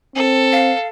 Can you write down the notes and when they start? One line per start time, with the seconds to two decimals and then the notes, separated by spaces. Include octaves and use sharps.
0.16 C4 A4
0.52 F5